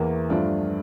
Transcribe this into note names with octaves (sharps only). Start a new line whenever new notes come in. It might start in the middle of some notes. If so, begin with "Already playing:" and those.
Already playing: E2 E3 A#3
G2 F3 A3 D4 F4